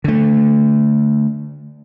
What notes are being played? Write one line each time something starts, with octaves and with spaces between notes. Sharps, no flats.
D3 A3